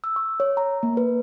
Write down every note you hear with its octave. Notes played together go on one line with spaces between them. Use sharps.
E6
C#6
C#5
A#5
A#3
B4